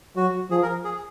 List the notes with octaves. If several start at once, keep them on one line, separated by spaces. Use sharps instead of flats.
F#3 F#4
F3 G#4
A#4
G#4